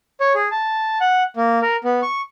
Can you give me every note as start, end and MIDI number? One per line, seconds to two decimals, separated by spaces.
0.20 0.33 73
0.35 0.48 68
0.51 0.98 81
1.01 1.23 78
1.37 1.59 58
1.62 1.76 70
1.84 2.01 59
2.02 2.21 85